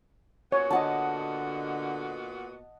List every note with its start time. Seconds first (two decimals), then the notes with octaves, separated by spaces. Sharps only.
0.52 A#2 B3 F#4 C#5
0.71 D3 D#5 F#5 A5